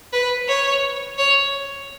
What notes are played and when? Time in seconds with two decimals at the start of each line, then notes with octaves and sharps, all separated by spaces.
0.13 B4
0.48 C#5
1.18 C#5